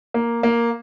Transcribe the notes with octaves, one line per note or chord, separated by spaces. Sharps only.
A#3
A#3